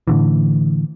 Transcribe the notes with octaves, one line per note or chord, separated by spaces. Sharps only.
A2 D3 E3